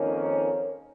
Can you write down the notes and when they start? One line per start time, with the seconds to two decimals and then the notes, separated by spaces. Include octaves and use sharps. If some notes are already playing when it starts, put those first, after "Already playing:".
Already playing: F2 D#3 A#3 C#4